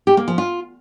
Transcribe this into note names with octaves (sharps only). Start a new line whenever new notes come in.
G4
A#3
F3
F4